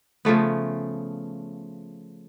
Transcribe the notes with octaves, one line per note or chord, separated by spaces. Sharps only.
C#3 F3 A3 B3